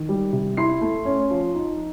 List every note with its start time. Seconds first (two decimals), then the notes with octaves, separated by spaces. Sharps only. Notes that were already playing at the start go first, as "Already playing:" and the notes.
Already playing: D#3
0.09 G3
0.33 C3
0.57 E4 C6 C7
0.81 A3
1.05 C#4
1.31 F3
1.55 D#4